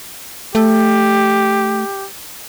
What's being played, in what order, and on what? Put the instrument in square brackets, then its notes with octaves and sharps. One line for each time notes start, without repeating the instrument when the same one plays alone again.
[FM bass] A3 [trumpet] G4